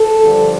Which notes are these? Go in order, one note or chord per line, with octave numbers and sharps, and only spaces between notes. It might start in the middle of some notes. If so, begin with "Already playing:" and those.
Already playing: A4
G2 D3 F3